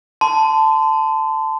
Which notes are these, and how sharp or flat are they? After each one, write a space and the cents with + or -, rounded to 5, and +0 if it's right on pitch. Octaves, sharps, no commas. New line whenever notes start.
A5 +0 C6 -30